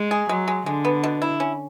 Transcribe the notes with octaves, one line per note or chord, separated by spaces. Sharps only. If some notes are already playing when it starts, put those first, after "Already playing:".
Already playing: G#3
G#4
F#3 G#3
G#3
D3 G#3
B3
B2
E4
C#4